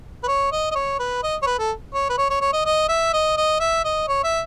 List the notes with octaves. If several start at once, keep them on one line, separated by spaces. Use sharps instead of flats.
B4
C#5
D#5
D#5
C#5
B4
D#5
C#5
B4
A4
C#5
B4
C#5
C#5
C#5
D#5
D#5
E5
D#5
D#5
E5
D#5
C#5
E5